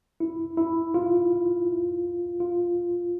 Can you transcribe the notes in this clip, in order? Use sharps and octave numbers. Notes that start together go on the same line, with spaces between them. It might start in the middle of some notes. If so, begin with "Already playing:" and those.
E4
E4
F4
F4